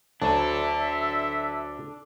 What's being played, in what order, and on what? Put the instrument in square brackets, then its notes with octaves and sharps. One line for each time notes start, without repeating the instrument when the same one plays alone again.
[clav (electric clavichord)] D2 F#3 [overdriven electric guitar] D4 A4 [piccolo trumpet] E5 [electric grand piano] A5